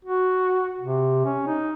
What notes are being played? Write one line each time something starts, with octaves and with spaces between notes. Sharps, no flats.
F#4
C3
C#4
D#4